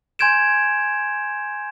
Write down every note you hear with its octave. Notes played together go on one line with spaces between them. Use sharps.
G#5 C6 G6 G#6 D7 E7